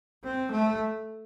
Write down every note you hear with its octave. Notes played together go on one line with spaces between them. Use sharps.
C4
A3